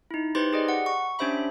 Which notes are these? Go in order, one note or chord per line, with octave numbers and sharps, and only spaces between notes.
D#4 E4
D#4 G4 B4 C5 C6 A6
G4 G#4 D5 D#5
F#5
C#6
C#4 D4 G4 C5 E5 B5